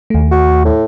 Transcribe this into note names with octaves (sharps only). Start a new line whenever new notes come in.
D#2 A3
F#4
A2